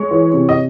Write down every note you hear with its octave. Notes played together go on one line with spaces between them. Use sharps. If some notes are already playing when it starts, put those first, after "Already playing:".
Already playing: G#3 C#5
E3
C3
D#5